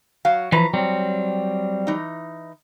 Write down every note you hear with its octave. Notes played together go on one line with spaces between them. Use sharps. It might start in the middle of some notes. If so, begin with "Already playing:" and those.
F#3 F5
E3 F3 B4 A#5
F#3 G3 C4
E3 D#4